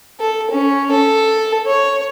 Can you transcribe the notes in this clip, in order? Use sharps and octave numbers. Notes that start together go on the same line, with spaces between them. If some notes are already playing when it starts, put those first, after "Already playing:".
A4
C#4
A4
C#5